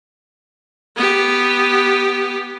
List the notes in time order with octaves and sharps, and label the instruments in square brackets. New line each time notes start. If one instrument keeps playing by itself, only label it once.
[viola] B3 G4